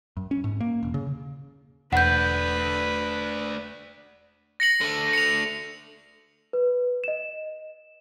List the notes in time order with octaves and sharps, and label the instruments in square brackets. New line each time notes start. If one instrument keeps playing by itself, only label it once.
[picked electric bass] F#2
C#4
G#2
A#3
E1
C#3
[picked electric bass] E1 [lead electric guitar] A3 D4 [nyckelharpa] B4 [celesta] F#5 G6
[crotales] A#6 C#7 F#7
[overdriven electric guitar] D3 A3
[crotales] C#7 F7
[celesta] B4
D#5 E7